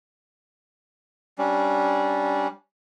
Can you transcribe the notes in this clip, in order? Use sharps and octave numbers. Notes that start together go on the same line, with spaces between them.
G3 C#4 D4